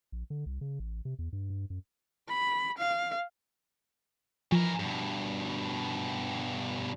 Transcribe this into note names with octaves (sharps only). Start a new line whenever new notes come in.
A#1
D3
C2
C#3
A1
C3
E2
G2
G2
F#2
B5
F5
E3 F3 A#4
G2 B2